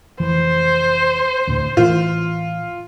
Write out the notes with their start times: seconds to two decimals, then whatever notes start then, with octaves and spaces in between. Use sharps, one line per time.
0.20 F1 E3 C5
1.47 D2 A2
1.77 A2 E3 F4